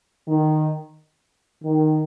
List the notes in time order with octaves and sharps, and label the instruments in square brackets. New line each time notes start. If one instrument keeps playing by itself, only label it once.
[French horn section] D#3
D#3